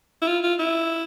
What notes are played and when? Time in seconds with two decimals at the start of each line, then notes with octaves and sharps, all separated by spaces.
0.22 E4
0.27 F4
0.43 F4
0.59 E4